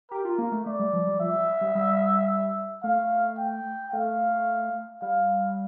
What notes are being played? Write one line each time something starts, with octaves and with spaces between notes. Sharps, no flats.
G4 A#4
F4
A#3
A3
A3 D5
G3
F3
G3
F3 E5
G3
G3
G3
A3 F5
G5
A3 F5
G3 F5